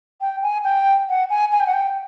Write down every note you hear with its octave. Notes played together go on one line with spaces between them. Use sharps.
G5
G#5
G5
F#5
G#5
G#5
G5
F#5
G5